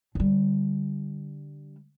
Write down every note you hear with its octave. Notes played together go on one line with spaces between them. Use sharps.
D3 G3